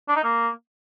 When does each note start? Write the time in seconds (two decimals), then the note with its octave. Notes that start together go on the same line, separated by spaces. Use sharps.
0.08 D4
0.16 D#4
0.24 A#3